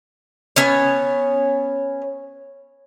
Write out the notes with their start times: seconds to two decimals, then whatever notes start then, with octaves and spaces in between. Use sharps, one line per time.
0.56 B3 C#4 C#5